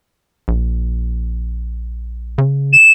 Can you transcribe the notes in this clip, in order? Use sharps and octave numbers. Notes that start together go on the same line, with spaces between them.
A#1
C#3
E7